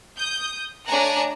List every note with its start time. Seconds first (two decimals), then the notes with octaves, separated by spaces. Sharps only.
0.17 D#6 G6
0.87 A3 D4 C#5 G#5 A#5 F#6